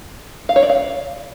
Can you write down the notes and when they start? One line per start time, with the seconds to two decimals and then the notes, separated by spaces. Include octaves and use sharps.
0.49 F5
0.56 C#5
0.63 D5
0.69 F5